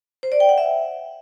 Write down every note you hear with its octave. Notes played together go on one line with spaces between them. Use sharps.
C5
D5
G5
F#5
E5